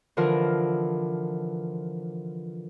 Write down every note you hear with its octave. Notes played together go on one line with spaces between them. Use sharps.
D3 E3 F3 F4 A#4